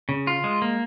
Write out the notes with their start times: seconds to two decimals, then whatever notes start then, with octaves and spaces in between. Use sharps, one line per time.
0.09 C#3
0.27 F4
0.44 G#3
0.62 A#3